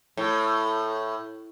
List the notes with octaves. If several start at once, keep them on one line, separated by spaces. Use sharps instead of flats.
A2